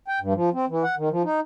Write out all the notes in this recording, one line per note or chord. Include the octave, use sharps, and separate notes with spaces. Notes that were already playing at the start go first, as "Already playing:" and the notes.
G5
G2
F3
C4
E3
F#5
D#3
F3
D#4